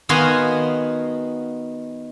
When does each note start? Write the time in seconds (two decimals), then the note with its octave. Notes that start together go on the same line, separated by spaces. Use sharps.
0.09 D#3 B3 F#4 F5 G#5 C6